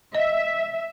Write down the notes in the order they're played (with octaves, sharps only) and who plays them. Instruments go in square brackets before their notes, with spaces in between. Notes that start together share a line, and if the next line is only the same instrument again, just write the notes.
[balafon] D#5 [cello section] E5